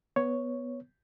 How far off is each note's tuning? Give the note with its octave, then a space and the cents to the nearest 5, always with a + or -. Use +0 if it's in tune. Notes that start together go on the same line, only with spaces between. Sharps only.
B3 +0 C#5 +0